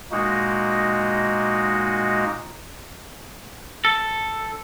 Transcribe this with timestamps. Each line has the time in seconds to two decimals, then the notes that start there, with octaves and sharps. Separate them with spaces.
0.12 A#2 G#3 A#3 D#4 F#4
3.85 A4